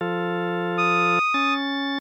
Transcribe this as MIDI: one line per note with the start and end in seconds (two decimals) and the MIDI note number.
0.01 1.19 53
0.01 1.19 65
0.01 1.19 69
0.78 1.54 87
1.34 1.98 61
1.34 1.98 93